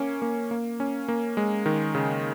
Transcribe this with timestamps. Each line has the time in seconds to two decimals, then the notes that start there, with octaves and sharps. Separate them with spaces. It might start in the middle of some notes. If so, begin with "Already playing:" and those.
Already playing: A#3 C#4
0.22 A#3
0.51 A#3
0.80 C#4
1.08 A#3
1.37 G#3
1.66 D#3
1.95 C#3